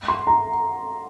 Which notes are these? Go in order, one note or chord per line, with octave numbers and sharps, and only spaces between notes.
C6
A#5